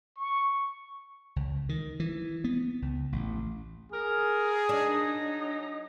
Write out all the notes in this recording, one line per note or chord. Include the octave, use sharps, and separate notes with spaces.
C#6
C#2
D#3
E3
B3
C#2
A1
G#4 A#4
F#3 D4 D#4